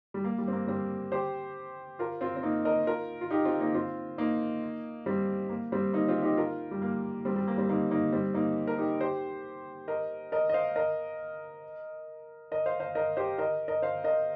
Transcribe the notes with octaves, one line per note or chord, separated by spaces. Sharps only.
G3
A#3
G3
C4
A#3
G3 C4
G4 C5
F4 A#4
C4 F4
C4
A#3 D#4
A#4 D#5
F4 A#4
F4
D#4 G4
C4 F4
A#3 D#4
C4 F4
A#3 D#4
G3 C4
A#3
G3 C4
A#3 D#4
C4 F4
D#4 G4
F4 A#4
G3
A#3
G3 C4
G3
A#3
G3 C4
A#3 D#4
A#3 D#4
G3 C4
A#3 D#4
A#4
D#4 G4
G4 C5
A#4 D#5
A#4 D#5
D#5
C5 F5
A#4 D#5
A#4 D#5
C5 F5
C5 F5
A#4 D#5
G4 C5
A#4 D#5
A#4 D#5
C5 F5
A#4 D#5